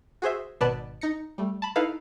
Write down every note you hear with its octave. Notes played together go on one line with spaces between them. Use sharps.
F#4 G#4 C5 E5
G#1 B2 B3 B4 D5 A5
D#4 A#6 C#7
G3 A3
A5 B5
D#4 E4 A4 B4 F5